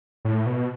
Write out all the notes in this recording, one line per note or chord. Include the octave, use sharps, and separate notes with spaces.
A2
B2